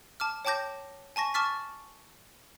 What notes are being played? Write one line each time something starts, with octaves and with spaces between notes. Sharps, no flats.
A5 D6 F6
C#5 G5 A5 D6 G6 A#6
G#5 A5 C#6 A#6
A5 C#6 D6 F6 A6 B6